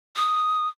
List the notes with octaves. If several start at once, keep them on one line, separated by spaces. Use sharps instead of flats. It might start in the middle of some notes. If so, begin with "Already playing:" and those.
D#6